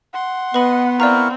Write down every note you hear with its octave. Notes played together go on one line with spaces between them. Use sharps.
F#5 C6
B3 B4 D#5 B5
C4 E4 A#4 D5 F5 A#5 C#6